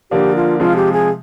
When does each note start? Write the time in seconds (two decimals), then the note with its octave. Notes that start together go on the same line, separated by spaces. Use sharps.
0.11 D3 F3 A#3 D4 G4
0.35 F4
0.60 C3 F3 G#3 F4
0.76 G4
0.93 G#4